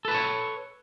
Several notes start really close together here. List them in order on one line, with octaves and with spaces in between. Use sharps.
A4 B4 A5 C#5